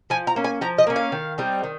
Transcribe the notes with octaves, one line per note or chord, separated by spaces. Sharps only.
F3 G#5
A#5
A#3 C#4
G#5
F3 A#5
D#5
A#3 C#4
F5
D#3
G3 C4 D#4
D#3